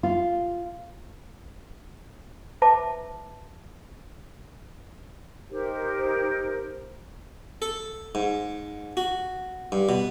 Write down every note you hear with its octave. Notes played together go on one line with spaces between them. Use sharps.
F4
B4 E5 A5 D6
D#4 G4 A#4 C5
A4
G#2
F#4
G2
B2